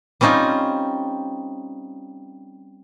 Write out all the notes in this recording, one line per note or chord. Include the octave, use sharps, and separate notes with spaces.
G3 C4 C#4 D#4 F4